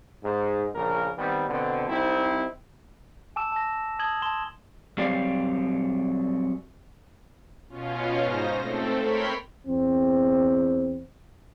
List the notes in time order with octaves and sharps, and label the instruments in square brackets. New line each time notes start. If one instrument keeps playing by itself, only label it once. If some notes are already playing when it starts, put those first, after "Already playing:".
[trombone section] G#2
A#1 C#3 A#4
D#3 G3 B3 C4
B2 D3 B3 C4
C2 C4 D#4 E4
[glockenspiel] G#5 A5 D6 E6 E7
A5 A#6
A5 D#6 G#6 F#7 G7
A5 C6 E7 G7
[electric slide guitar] F#3 G3 C4 G4 D5 F5
[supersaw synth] B2 C#4 F4
G#2 D#4 C5 A#6
A3 C4 A4
A#4 C#5 G5 B5 C6 B6
[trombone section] E2 C4